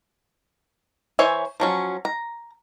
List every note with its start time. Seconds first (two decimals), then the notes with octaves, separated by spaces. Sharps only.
1.19 E3 C5 C#5 E5 G#5
1.60 F3 F#3 C#4
2.05 A#5